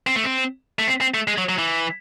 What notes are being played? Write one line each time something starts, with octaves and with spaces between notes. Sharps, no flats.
C4
A3
C4
A3
C4
C4
A3
G#3
F#3
F#3
E3